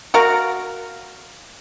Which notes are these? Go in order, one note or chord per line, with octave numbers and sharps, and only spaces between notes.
F#4 A#4 F5